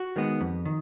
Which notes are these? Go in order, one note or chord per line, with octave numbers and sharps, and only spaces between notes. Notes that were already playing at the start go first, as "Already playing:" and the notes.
Already playing: F#4
D#3 G#3 B3
F2
D#3